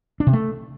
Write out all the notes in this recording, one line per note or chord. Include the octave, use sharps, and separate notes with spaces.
D4
C3
A3